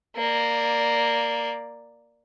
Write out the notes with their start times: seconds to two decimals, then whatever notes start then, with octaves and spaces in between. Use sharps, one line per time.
0.16 A#3 D5